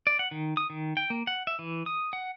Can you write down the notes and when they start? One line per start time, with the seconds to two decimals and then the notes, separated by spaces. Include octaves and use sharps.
0.07 D5
0.19 F#5
0.31 D#3
0.57 D#6
0.70 D#3
0.97 G5
1.10 A#3
1.27 F#5
1.47 E5
1.59 E3
1.86 D#6
2.13 F#5